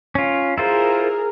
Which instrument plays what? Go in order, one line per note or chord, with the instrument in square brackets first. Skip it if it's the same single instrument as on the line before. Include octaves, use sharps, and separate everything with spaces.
[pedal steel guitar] C#4 F4
[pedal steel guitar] E4 F4 C5 [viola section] G#4 A#4